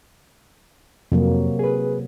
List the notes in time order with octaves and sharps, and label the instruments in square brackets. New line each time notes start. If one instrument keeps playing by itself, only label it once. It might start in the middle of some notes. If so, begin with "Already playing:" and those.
[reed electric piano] F2 [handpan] C3 F#3 A#3
[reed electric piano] G#4 B4